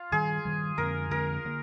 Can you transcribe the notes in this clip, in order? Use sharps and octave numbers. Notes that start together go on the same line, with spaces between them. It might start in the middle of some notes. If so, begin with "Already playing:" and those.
Already playing: F4
G2 D#3 G3 G#4
G2 D#3 G3
F2 D3 G#3 C4 A#4
F2 D3 G#3 C4 A#4
D3 F3 A#3